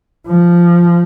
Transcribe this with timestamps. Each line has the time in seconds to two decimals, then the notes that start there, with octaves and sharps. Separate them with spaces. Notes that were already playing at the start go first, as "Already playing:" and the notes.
0.28 F3